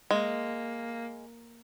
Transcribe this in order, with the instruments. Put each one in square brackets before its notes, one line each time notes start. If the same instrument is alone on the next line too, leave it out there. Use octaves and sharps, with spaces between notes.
[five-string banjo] G#3 [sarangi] A#3